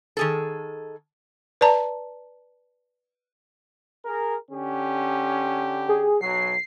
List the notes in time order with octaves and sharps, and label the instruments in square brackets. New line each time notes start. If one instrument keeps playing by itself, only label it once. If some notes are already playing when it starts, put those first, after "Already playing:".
[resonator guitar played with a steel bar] D#3 G#4 A4
[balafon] B4 D5 A5 A#5
[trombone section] G#4 A#4
D3 C#4 G4
[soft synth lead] G#4
[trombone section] B1 F#3 [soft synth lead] C7